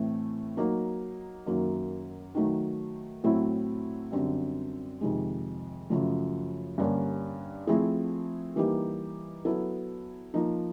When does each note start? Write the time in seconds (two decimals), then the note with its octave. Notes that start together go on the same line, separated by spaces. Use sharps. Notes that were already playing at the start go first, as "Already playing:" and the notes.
Already playing: A2 E3 A3 C4
0.57 F#3 A#3 D#4
1.46 F#2 D#3 F#3 A#3
2.35 D#3 F#3 A3
3.24 A2 F#3 A3 C4 E4
4.12 F#2 D3 G3 C4
5.01 F2 C3 D#3 G#3
5.89 F#2 C#3 F3 A3
6.78 G2 D3 G3 A#3 C#4
7.67 F3 A3 C4 E4 G#4
8.56 E3 G3 A#3 D#4 G4
9.45 F#3 B3 E4 A4
10.34 F3 A#3 D#4